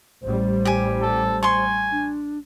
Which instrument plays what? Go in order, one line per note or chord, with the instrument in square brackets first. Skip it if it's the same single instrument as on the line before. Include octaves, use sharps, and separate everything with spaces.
[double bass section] A1 G3 [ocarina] C5
[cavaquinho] G4 G#5
[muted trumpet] A4
[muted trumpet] G#5 [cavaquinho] C6 C#6
[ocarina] D4